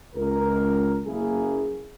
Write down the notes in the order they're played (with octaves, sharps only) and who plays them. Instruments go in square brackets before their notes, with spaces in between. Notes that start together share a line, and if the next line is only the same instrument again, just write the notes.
[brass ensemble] C#2 A#4
F#1 F#2 A#3 E4 G#4